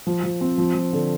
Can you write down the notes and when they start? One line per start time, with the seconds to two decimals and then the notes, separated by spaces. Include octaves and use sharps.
0.07 F3
0.24 F3
0.41 C4
0.58 F3
0.75 F3
0.93 D3